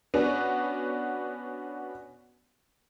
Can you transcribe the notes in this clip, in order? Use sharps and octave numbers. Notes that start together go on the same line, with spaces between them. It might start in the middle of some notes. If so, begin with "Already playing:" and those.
B3 C#4 D4 F#4